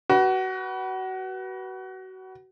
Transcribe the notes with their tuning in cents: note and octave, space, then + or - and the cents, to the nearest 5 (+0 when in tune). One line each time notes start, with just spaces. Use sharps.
F#4 +25 B4 -20